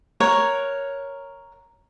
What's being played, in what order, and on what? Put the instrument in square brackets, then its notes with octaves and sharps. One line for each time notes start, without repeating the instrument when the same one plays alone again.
[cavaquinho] A#4 C#5 F#5